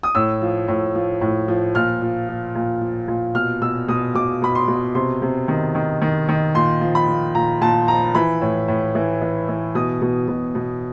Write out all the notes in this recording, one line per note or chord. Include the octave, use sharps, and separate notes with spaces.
D#6
A2 E6
F3
A2
F3
A2
F3
A#2 F6
F3
F3
A#2
F3
A#2
B2 F6
B2 E6
B2 D#6
B2 D6
B2 B5
C6
B2
C3 C6
C3
D#3
D#3
D#3
D#3
A#2 C6
F3
B5
F3
A#2 A#5
A#2 A5
F3 A#5
E3 B5
A2
A2
E3
E3
E3
B2 D#6
B2
B2
B2